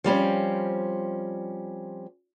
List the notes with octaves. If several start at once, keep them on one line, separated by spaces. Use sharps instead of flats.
F3 G3 C4 C#4